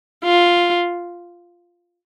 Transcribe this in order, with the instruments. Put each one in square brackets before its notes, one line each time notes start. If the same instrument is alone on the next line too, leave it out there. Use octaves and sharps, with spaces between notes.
[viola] F4